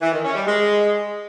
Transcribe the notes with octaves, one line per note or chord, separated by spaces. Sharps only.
E3
D#3
C#4
G3
G#3